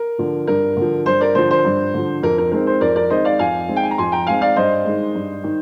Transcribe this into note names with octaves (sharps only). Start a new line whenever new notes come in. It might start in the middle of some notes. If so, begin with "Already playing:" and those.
Already playing: A#4
D3 F3
G2 A#4
D3 F3
G2 C5
A#4 D5
D3 F3 C5
C5
G2
D3 F3
F2 A#4
A#4
D#3 G#3 C4 A#4
C5
F2 A#4 D5
A#4 D5
D#3 G#3 C4 C5 D#5
D5 F5
F2 F5 G#5
D#3 G#3 C4
G5
G#5
A#5
F2 G#5 C6
G5 A#5
D#3 G#3 C4 F5 G#5
D5 F5
G2 C5 D#5
D#3 G#3
G2
D#3